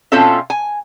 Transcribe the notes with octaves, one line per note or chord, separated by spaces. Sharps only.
B2 C4 C#4 F4 A4 E5
G#5